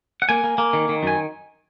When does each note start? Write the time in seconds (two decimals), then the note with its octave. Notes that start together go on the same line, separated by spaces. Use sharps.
0.22 F#5
0.29 A#3 G#5
0.44 A#3
0.58 A#3
0.73 D#3
0.89 D#3
1.03 F#2 G#5